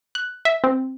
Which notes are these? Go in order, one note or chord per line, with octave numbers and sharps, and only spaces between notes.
F#6
E5
C4